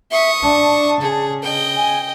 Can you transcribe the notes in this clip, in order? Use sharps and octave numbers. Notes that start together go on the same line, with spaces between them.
E5 C#6 D#6
D4 A5
C#3 G#4
D#5 G5
G#5